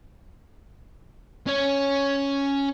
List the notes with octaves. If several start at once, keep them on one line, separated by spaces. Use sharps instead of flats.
C#4 C#5